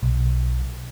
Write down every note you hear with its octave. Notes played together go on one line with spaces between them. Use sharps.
B1